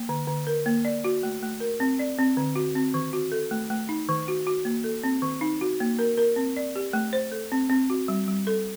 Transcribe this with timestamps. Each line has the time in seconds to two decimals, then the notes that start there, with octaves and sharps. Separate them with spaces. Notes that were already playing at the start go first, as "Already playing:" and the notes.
Already playing: A#3
0.09 D3
0.27 D3
0.47 A#4
0.66 A#3
0.85 D5
1.04 F#4
1.23 A3
1.43 A3
1.60 A#4
1.80 C4
1.99 D5
2.19 C4
2.37 D3
2.56 F#4
2.75 C4
2.94 D#3
3.13 F#4
3.32 A4
3.51 A3
3.70 A3
3.89 D#4
4.09 D#3
4.28 F#4
4.47 F#4
4.65 A#3
4.84 A4
5.04 C4
5.22 D#3
5.41 D#4
5.61 F#4
5.80 A#3
5.99 A#4
6.18 A#4
6.36 C4
6.57 D5
6.76 G4
6.93 A3
7.13 C5
7.32 A4
7.52 C4
7.70 C4
7.90 F#4
8.08 G3
8.28 G3
8.47 A4